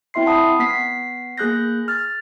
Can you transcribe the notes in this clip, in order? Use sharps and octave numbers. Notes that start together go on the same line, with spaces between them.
C4 E4 E5 C6 C7
F#5 A5 B5 D#6
B3 B6 C7
A#3 G#4 F#6 G6 A#6
F6 A6